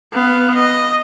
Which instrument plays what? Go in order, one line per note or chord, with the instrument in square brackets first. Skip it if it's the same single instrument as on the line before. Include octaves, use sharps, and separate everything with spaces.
[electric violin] B3 F5
D#5